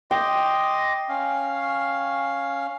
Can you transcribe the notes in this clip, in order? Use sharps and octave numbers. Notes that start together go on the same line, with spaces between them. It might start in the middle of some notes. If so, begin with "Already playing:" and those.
D#5 G5 C6 D6
C#4 F5